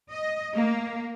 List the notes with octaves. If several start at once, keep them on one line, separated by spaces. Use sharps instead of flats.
D#5
A#3